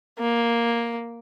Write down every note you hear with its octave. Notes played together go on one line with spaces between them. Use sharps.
A#3